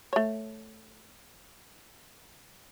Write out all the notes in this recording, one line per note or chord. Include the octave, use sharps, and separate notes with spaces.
A3 C#5